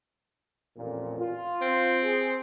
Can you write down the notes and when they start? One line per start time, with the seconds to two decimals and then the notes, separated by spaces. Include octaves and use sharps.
0.77 A1 F2 A#2
1.20 F4
1.61 C4
2.04 G#4